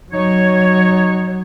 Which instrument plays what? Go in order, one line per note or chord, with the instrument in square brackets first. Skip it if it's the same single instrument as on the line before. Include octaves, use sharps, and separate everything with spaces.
[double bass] F#3 [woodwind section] D#4 C#5